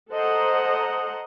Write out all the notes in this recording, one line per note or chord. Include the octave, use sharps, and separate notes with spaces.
A4 C5 D#5 F#5 A#5